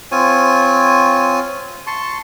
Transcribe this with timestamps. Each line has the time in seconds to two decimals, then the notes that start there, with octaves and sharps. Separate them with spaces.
0.12 C4 F4 C#5 G#5
1.87 A5 C6 C#6